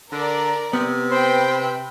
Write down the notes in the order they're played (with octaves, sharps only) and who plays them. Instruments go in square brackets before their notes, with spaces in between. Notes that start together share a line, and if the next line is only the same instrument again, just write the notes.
[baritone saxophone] D3 [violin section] A#4 D5
[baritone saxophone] C3 [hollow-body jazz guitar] B3
[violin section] B4 G5 B5 [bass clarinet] C5